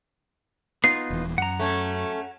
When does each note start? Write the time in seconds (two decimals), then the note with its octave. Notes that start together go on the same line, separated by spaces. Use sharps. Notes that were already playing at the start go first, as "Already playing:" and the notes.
0.84 B3 D#4 F4 C7
1.10 D#1 E3
1.38 F#2 F#5 A#5
1.59 A3 C#4